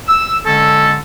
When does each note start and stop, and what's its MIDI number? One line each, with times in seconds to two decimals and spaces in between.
0.08 0.38 88
0.46 0.96 50
0.46 0.96 56
0.46 0.96 61
0.46 0.96 69